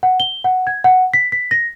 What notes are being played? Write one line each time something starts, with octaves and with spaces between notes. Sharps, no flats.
F#5
G7
F#5
G#6
F#5
B6
B6
A#6